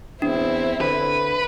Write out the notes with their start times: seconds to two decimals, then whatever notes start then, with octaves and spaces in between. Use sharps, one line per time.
0.22 E2 C4 D4 E4
0.81 D3 B4